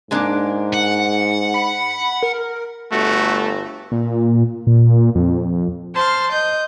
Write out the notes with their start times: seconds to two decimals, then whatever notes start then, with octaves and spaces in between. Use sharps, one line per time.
0.11 G#2 G#3 A#3 D4
0.74 F#5
1.54 B5
2.23 A#4
2.92 G1 A3 F#4
3.92 A#2
4.67 A#2
5.15 F2
5.95 C5 A5 C6 F6
6.31 D#5 G6